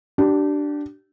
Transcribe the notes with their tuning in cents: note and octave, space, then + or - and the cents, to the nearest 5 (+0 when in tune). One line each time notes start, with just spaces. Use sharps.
D4 +0 G4 -30